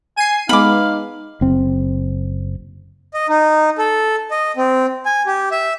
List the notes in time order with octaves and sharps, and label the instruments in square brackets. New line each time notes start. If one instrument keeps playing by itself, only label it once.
[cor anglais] G#5 [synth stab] C7 D#7
[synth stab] G#3 B3 [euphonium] D#4 [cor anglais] F5 [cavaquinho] B5 D6
[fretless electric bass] F#1 C4
[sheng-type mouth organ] D#5
D#4
A4
D#5
C4
G#5
G4
E5